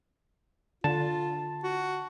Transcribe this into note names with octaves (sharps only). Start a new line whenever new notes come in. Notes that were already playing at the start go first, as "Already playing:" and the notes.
D3 F4 A5
F#4